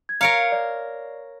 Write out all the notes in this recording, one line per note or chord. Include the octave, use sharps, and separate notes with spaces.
G#6
A#4 C#5 F5 A#5 C#7 D7
D5